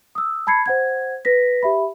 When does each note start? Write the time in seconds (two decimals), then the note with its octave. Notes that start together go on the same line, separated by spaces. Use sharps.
0.15 D#6 E6
0.47 A5 B5 G#6 C7 C#7
0.66 C5 F#5 G#6
1.25 B4 A#6 B6
1.63 G4 E5 B5